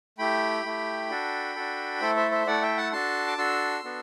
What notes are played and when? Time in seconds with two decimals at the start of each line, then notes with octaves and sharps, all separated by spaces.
0.18 A3 E4 G4 G5 B5
0.64 A3 E4 G4
1.10 D4 F#4 A4
1.56 D4 F#4 A4
2.01 A3 E4 A4 C5 E5
2.16 C5 E5
2.31 C5 E5
2.47 A3 E4 A4 D5 F#5
2.62 E5 G5
2.77 F#5 A5
2.92 D4 F#4 A4 A5 C6
3.27 D6
3.38 D4 F#4 A4 C6 E6
3.84 B3 D4 F#4 A4